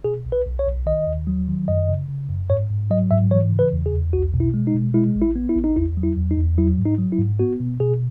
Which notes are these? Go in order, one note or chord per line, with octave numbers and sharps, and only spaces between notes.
B2 G#4
B1
B4
B1
C#5
B1
D#3 D#5
D#2
F#3
D#3
F#2 D#5
C#3
C#3
F#2
G#2 C#5
G#2
F#3 D#5
G#2 E5
E3 C#5
C#3
B4
E2
G#4
E2
B1 F#4
B2
E4
G#3
D#4
B2
G#3 E4
A1
E4
B3
E4
A1
D#4
E2 E4
F#3
E4
E2
D#4
E2
F#3 E4
G#2
D#4
F#3
E4
G#2
B3 F#4
B2
B2 G#4